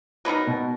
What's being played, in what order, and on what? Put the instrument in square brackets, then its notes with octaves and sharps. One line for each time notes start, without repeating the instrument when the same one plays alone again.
[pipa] F#3 B3 D#4 A#4
[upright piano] B2